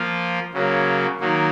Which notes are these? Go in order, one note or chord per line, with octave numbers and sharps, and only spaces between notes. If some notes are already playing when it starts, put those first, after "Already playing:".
Already playing: F3 A#3 F4
C#3 F#3 A#3
D#3 F#3 A#3